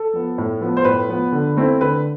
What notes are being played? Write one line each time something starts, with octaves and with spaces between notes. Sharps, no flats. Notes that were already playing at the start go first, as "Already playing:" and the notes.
Already playing: A4
F3 B3
A2
F3 B3
C5
A2 B4
F3 B3
D3
A3 C4 E4
D3 B4